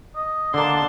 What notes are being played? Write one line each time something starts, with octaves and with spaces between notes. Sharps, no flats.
D#5
D3 A#3 D4 A5 C6